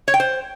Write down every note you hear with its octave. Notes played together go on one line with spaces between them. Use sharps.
C#5
G5
C5